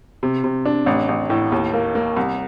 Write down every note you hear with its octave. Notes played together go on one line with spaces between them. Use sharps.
C3
C3
D4
A1
A1
A2
D#2
A#3
A#3
C2